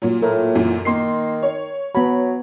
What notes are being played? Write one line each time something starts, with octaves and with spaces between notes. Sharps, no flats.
A#2 F#3
A2 A#4
F#2 A#2 E3
D#3 A#3 C6 C7
C#5
F#3 B3 B5